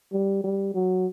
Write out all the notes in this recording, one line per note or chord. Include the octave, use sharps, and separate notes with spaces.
G3
G3
F#3